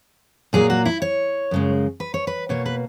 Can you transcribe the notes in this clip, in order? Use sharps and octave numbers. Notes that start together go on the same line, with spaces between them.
A#2 F#3 A#3 G#4
F#4
E4
C#5
F#2 C#3 G#3
B4
C#5
B4
B2 A#3 C#5
B4